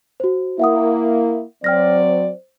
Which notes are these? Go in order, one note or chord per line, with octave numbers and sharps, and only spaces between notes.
F#4 C5
A#3 E4 E5 F#5 D#6
F#3 C4 D5 G5 F6 A#6
C5